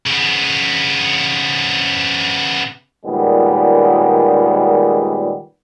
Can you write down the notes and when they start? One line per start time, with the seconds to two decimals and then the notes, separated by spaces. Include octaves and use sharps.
0.07 C#3 B3
3.05 C#2 A#2 D#3 G3 G#3 B3